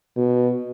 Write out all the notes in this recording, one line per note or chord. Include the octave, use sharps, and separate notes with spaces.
B2